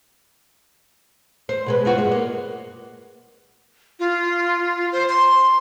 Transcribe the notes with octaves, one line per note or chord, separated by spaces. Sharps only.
C5
B2 G#3 B4
B3 F4 F#4
G2 G#3
A#3
F4
C5
C6